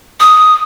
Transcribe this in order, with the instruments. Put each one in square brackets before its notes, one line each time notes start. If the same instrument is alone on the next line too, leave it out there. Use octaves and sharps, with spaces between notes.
[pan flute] D#6